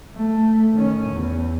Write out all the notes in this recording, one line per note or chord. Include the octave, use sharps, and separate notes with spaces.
A3
D#3 C#4
E2